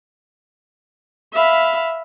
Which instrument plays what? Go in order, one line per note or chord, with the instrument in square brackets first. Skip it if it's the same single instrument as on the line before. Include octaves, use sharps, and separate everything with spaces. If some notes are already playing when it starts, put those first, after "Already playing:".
[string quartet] E5 F5 B5